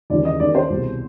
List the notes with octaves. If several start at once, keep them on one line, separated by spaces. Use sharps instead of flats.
D#2 C#3 E3 D5
D#5
D#2 D#3 D5
C5
C2 B2